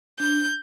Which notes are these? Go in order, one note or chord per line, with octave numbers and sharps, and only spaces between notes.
D4 G6